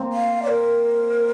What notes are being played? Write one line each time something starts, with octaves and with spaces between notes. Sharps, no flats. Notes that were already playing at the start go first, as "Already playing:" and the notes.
Already playing: A#3 C4
F5
D5
A#4